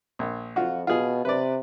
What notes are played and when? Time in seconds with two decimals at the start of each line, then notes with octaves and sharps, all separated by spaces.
0.19 A#1
0.56 F2 F4 F#4
0.87 B2 F4 G#4
1.25 C3 B4 D5